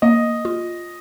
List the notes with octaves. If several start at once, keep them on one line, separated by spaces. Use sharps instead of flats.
A#3 D#5
F4